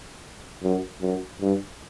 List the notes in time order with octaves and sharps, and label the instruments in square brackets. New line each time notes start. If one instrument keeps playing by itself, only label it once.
[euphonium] F#2
F#2
G2